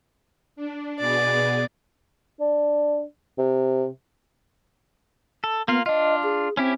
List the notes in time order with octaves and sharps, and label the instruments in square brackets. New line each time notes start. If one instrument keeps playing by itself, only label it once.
[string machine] D4
[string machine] B2 B3 G#4 [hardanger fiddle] D5
[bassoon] D4
C3
[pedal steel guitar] A4
[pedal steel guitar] A#3 F4 [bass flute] B3
[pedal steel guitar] D4 F4 [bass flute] D#5
[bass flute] G#4
[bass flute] C4 [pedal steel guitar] C#4 E4 G4